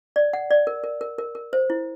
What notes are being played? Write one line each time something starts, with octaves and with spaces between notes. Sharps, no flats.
D5
F#5
D5
A#4
A#4
A#4
A#4
A#4
C5
E4